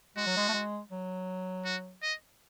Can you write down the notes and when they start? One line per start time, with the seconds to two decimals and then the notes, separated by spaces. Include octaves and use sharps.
0.16 G#3 F#4
0.26 F#3
0.37 G#3
0.49 A3
0.54 G#3
0.91 F#3
1.65 F#4
2.02 D#5